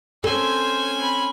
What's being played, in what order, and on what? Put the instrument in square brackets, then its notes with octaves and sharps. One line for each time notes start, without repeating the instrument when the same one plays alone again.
[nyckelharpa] C4 C5 [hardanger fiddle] C#4 G#5 [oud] A4
[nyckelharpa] C4 B5